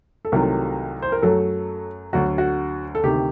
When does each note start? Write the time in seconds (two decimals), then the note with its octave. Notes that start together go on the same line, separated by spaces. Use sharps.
0.25 A4
0.32 C2 C3 D#3 F#3 A3 A#4
1.02 C5
1.12 A#4
1.22 F#2 F#3 A3 A4
2.13 D2 D3 F#3 F#4
2.38 F#4
2.95 A4
3.03 D2 C3 D#3 G4